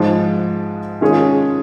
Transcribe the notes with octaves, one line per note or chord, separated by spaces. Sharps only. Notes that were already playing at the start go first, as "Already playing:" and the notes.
Already playing: G#2 F3 G#3
D#3 G#3 C#4 F4 G#4